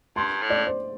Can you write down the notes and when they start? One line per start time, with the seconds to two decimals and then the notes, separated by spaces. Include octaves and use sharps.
0.16 G2 C6
0.42 A2
0.50 D5
0.67 C5